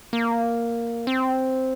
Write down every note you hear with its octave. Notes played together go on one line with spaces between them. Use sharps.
A#3
C4